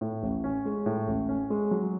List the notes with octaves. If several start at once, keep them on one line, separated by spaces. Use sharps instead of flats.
A2
A1
C#4
G#3
A2
A1
C#4
G#3
F#3